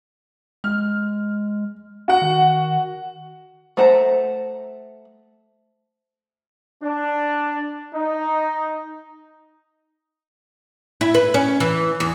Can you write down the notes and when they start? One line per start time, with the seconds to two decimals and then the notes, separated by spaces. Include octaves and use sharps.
0.64 G#3 F6
2.08 F#4 F#5
2.22 D#3
3.77 A3 C5 F#5 A5 A#5
6.82 D4
7.94 D#4
11.01 E4
11.14 B4
11.34 C#4
11.60 E3
12.00 E2